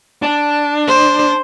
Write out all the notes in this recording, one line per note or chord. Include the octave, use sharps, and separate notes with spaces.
D4
C5